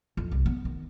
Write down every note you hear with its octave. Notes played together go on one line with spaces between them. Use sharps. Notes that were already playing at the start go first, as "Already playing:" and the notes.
F2
C2
B3
D#3